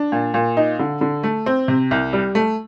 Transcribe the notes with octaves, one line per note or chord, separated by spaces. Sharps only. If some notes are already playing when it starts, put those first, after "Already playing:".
Already playing: D4
A#2
A#2
D#4
D3
D3
A3
C4
C3
C2
G3
A3